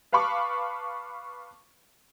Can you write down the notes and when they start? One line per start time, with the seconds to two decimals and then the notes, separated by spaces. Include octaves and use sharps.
0.12 B4 F5 A5 B5 C#6 D6